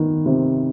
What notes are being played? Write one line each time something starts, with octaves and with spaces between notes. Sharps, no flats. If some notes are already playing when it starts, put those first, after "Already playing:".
Already playing: D#3 B3
C3